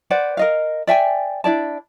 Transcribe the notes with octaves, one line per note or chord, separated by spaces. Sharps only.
B4 C5 D5 F#5
A#4 D#5 F5
D5 E5 G5 G#5
D4 E4 D5 A5